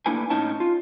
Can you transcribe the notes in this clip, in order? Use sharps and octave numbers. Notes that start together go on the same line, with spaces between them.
A3 A#3 D4 E4 B4 G#5
A2 C#4 D#4 C#5 D#5 A5
F4